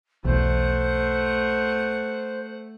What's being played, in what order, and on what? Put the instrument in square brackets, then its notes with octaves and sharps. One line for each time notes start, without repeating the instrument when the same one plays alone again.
[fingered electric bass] B1 E2 [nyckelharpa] A3 F#5 [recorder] C5